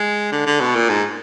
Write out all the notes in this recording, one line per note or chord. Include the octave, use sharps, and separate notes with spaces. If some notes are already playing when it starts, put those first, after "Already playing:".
Already playing: G#3
D3
D3
B2
A#2
G#2